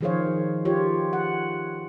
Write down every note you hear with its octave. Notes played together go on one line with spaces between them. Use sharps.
D#3 F3 G#4 C5 C#5 F5
F4 G4 C#5
F#5